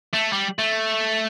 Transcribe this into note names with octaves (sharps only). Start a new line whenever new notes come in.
A3
G3
A3